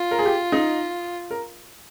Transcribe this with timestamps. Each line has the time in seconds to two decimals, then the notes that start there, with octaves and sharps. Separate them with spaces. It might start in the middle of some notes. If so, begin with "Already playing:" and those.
Already playing: F4
0.11 A#4
0.19 G#4
0.26 G4
0.52 D#4
1.31 A#4